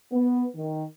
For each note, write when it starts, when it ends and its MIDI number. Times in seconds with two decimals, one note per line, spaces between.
0.12 0.45 59
0.55 0.84 51